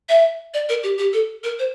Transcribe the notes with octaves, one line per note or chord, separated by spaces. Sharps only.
E5
D5
A#4
G4
G4
A4
A#4
C5